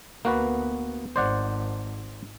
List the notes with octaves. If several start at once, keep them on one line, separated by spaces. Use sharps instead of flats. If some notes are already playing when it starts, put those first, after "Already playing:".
D2 A#3 B3 F#4 B4
G#1 C5 D5 F#5